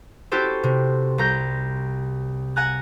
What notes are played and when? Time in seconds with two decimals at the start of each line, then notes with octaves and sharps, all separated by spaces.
0.32 C#4 E4 F#4 G4 A4 C5
0.63 C3
1.18 C2 A#5 G6
2.56 F#5 G#5 A#5 F#6